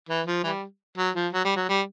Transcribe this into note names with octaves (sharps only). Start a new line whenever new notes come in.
E3
F3
E3 G3
F#3
F3
F#3
G3
F#3
G3